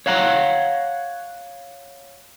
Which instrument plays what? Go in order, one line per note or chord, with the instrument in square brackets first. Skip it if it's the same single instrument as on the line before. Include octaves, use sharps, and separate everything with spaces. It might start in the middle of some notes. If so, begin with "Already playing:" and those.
[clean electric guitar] C#5 F5 F#5 A#5